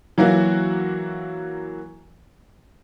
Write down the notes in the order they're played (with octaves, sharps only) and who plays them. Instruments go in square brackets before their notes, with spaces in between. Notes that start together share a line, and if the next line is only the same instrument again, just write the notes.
[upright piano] E3 F#3 A#3 E4 F#4